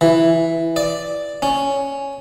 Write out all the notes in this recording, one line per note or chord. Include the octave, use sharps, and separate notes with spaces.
E3
D5
C#4